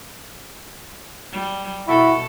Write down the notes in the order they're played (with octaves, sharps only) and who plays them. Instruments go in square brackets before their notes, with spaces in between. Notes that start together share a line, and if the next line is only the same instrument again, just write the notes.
[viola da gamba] G3
[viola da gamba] B2 A4 [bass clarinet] E4 [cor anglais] F#4